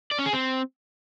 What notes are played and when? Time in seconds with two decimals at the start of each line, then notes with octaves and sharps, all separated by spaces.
0.11 D5
0.19 C#4
0.26 G#4
0.33 C4